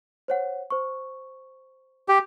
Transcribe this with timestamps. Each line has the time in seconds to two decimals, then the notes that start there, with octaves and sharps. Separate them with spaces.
0.28 C5 C#5 F#5
0.70 C5 C#6
2.09 G4